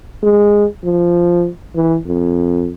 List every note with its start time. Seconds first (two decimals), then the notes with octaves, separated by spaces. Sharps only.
0.23 G#3
0.84 F3
1.76 E3
2.06 F2